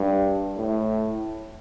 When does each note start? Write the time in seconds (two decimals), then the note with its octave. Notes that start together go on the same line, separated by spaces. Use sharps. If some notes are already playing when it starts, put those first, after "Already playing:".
Already playing: G2
0.57 A2